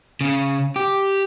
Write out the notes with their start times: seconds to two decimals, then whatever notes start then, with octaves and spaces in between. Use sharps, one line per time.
0.21 C#3
0.76 G4